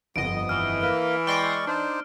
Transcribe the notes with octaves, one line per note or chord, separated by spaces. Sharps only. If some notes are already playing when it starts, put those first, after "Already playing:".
G1 F2 B3 D#5 D7
E3 F6
A#3 A#4 B4
G#3 D5 G5 C6 C#6 A#6
D4 D#4 C5